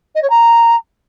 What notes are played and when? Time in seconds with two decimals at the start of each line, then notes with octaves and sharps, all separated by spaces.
0.15 D#5
0.22 C#5
0.29 A#5